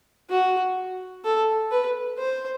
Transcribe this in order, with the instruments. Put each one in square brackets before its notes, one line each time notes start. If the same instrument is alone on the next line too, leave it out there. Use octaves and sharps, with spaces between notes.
[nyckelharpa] F#4
A4
B4
C5